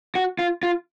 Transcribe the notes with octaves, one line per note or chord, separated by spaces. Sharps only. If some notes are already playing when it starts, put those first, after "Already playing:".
F#4
F4
F4